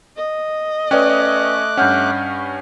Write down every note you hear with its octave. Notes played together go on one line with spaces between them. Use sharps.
D#5
A3 C#4 B4 D5 G5 D6 F#6
G2 C#4 F#5 F6 G6